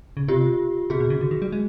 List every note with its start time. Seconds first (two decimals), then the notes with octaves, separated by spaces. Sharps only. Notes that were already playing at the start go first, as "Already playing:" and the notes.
0.17 C#3
0.28 C3 F4 G4
0.90 C3 F#4 G#4
1.00 B2
1.10 C#3
1.21 D3
1.31 D#3
1.42 G3
1.52 G#3